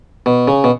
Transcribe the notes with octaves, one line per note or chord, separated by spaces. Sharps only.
B2
C#3
B2